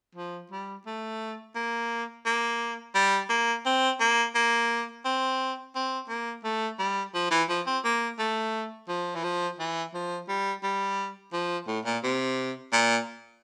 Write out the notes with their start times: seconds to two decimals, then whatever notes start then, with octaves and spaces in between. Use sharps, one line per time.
0.15 F3
0.51 G3
0.86 A3
1.55 A#3
2.26 A#3
2.95 G3
3.30 A#3
3.66 C4
4.00 A#3
4.35 A#3
5.05 C4
5.75 C4
6.09 A#3
6.44 A3
6.79 G3
7.14 F3
7.31 E3
7.49 F3
7.67 C4
7.85 A#3
8.19 A3
8.89 F3
9.15 E3
9.24 F3
9.59 E3
9.94 F3
10.28 G3
10.63 G3
11.33 F3
11.67 A2
11.86 A#2
12.03 C3
12.73 A#2